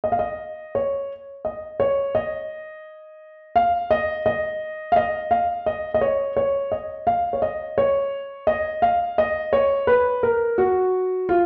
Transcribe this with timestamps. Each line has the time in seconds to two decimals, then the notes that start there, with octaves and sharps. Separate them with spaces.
0.04 D#5
0.12 F5
0.19 D#5
0.75 C#5
1.45 D#5
1.80 C#5
2.15 D#5
3.56 F5
3.91 D#5
4.26 D#5
4.92 F5
4.96 D#5
5.31 F5
5.66 D#5
5.94 D#5
6.01 C#5
6.37 C#5
6.72 D#5
7.07 F5
7.33 C#5
7.42 D#5
7.78 C#5
8.47 D#5
8.82 F5
9.18 D#5
9.53 C#5
9.87 B4
10.23 A#4
10.58 F#4
11.29 F4